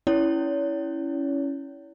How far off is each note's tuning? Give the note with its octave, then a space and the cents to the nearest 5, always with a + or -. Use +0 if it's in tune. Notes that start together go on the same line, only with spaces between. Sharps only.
C#4 +0 E4 +0 C#5 +40